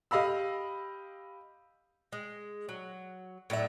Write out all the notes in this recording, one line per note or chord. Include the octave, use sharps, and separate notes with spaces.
G4 D#5 F5 B5 E6
G#3
F#3
A2 F#3 D4 E5